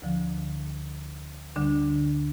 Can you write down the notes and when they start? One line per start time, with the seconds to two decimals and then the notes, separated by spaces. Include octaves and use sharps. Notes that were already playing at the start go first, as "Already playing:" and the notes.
0.02 D2 D3 F3
1.56 D2 D3 G3 D4